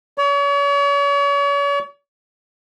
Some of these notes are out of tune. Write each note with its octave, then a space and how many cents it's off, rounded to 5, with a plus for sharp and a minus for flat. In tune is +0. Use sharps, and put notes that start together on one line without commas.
C#5 +40